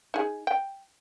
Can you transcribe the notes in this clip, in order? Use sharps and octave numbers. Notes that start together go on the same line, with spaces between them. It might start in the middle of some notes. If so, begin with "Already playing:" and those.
D#4 G#4
G5